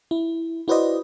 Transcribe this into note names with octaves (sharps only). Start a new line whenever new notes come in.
E4
E4 F#4 B4 C5 D5 D#5